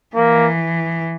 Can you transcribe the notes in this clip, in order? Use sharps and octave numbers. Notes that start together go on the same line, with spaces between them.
E3 A#3